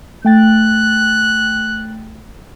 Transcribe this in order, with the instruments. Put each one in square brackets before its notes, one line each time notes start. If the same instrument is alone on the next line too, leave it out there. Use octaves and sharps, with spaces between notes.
[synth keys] A3 G5 A6 [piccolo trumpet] F#6